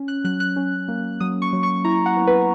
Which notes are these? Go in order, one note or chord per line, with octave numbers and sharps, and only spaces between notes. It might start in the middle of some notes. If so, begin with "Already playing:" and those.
Already playing: C#4
F#6
F#3 F#6
F#6
C#4
A#3
F#3 D#6
C#6
F#3
C#6
E4 A#5
F#5
B3
B4